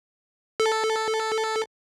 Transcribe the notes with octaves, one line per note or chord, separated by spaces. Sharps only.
A4